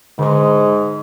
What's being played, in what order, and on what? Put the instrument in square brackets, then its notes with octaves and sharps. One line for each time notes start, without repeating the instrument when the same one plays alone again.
[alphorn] G#2 [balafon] D3 C6